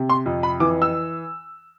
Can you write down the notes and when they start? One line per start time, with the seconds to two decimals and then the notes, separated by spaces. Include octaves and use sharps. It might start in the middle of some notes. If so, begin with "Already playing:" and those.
Already playing: C3
0.10 C6
0.26 F2
0.43 B5
0.60 E3 D6
0.82 E6